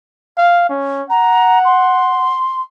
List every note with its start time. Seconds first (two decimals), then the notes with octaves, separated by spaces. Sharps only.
0.38 F5
0.69 C#4
1.10 F#5 A#5
1.65 C6